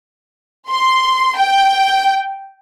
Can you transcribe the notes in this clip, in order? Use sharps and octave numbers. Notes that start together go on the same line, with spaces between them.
C6
G5